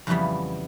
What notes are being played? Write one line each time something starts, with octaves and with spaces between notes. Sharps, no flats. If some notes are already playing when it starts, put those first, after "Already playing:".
F2 C#3 E3 G3 B3